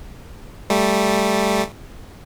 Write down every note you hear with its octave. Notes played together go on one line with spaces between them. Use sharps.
G3 A3